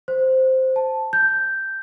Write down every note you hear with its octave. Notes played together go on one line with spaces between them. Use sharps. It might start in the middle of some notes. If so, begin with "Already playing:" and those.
C5
A5
G6